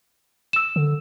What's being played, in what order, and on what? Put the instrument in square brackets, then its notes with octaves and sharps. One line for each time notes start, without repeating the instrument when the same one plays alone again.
[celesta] E6 E7
[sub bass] D3